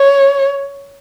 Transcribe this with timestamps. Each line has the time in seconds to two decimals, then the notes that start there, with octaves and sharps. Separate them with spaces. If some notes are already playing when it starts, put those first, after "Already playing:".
Already playing: C#5